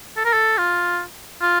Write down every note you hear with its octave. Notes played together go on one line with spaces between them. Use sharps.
A4
A#4
A4
F4
F4